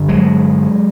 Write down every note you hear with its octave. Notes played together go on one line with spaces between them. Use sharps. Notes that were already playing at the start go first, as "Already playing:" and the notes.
Already playing: G2 D3
F#3 G#3